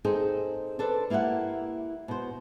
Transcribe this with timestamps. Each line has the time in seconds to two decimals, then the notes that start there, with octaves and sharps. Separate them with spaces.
0.04 C4 D#4 G#4 A4 C5
0.79 D4 A4 B4 C5
1.10 A#3 E4 G4 E5 F#5
2.08 B2 C5